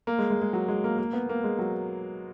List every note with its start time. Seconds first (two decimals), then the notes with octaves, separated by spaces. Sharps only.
0.07 A#3
0.19 G#3
0.30 G#3
0.42 G#3
0.53 F#3
0.68 G#3
0.84 A#3
0.99 A#3
1.13 B3
1.29 A#3
1.44 G#3
1.59 F#3